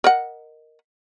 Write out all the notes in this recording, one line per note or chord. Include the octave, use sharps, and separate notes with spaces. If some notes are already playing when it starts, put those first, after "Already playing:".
A#4 D#5 F#5